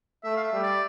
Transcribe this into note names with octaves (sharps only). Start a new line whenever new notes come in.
A3 E5
F5
E5
G3
D5